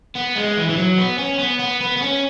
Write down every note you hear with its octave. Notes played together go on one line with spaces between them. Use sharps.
B3
G#3
E3
E3
F#3
B3
C#4
B3
B3
B3
B3
C#4